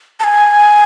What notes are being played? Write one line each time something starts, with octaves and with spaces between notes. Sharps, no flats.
A5
G#5